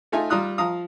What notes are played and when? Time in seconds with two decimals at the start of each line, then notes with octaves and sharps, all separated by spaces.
0.12 A3 D#4 F4 E5 G#5
0.30 G3 F4 A#5 D#6 F#6
0.58 F3 F5 A#5 D#6